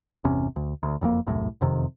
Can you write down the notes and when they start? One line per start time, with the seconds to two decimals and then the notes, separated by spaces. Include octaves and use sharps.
0.24 G1 E2 C3 C#4
0.56 D2
0.83 D2
1.01 F#1 F2 C#3 A#3
1.27 E1 C2 F#2 A2
1.61 F#1 F2 C3 D#3